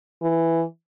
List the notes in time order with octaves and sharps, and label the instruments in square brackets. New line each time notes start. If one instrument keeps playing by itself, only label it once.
[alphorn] E3